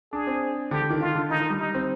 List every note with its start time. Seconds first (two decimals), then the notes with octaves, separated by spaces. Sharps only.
0.12 D4 G#4
0.27 C4
0.71 D3 G4
0.82 D3
0.90 D#3
1.01 D#3 F4
1.15 D3
1.30 D#3 D#4
1.40 D#3
1.50 G3
1.59 D#4
1.75 C4